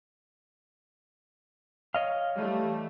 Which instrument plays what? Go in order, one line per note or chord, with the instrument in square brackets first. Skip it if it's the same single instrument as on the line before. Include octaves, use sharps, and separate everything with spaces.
[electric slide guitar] C#5 D#5 F5
[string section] E3 G3 A3